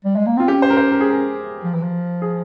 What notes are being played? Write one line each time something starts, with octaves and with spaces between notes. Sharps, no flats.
G3
G#3
A#3
C4 F4
C#4 G4
C5
A#4
C5
A#4
G#4
A#4
F3
E3
F3
G#4